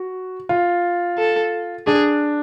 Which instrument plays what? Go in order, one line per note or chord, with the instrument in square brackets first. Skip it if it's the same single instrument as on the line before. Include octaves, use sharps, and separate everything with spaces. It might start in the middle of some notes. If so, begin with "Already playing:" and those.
Already playing: [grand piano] F#4
F4
[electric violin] A4
[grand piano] D4 [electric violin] G#4